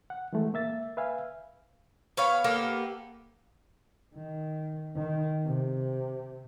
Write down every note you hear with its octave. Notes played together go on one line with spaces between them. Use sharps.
F#5
E3 G#3 A3
A#3 E5 A6
B4 E5 F5 G#5
B3 C#5 F5
A#3 B3 G4 A4
D#3
D#3
C3